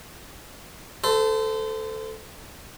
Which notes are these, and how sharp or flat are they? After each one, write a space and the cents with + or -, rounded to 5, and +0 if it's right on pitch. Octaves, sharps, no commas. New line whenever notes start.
A4 +0 C5 -30